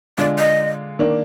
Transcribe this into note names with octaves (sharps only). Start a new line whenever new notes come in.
D3 G#3 D4 F4 D5
D#5
D#3 A#3 D4